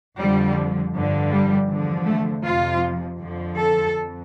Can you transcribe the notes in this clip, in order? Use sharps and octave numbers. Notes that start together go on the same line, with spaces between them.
F2 D3 F3 G3
G2 D3 F3
G3
E2 D3 F3
A3
F2 C3 F3 F4
F2 D3 F3
A4
F2